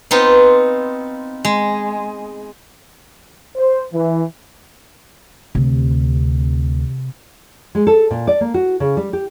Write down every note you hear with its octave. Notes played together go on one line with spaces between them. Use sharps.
B3 C4 D#4 F4
G#3
C5
E3
D2 C3
G#3
A4
A#2
D5
A#3
F#4
C#3
G3
G4